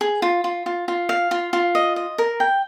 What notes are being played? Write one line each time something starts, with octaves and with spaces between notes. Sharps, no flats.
G#4
F4
F4
F4
F4
F5
F4
F4
D#5
D#5
A#4
G5